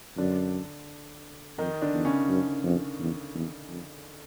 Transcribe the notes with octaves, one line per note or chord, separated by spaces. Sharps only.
F#2 D3 D4
F2 D#3 D#4
D3 D4
E2
C#3 C#4
F#2
F2
E2
E2
F2